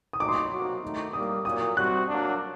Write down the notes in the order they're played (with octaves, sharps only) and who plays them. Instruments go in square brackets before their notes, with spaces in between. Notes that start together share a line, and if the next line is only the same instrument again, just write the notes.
[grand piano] D#6
[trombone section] A#2 F#3 A3 D#4 [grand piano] D6
[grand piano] C6
D6
[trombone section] C3 F#3 A#3 F#4
D#3 A3 D#4
[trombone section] A2 G3 A#3 [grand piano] D#6
[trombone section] A#2 F#3 A#3 [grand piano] D#6
[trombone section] C3 G3 C4 F#4 [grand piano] F#6
[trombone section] F#3 A#3 D4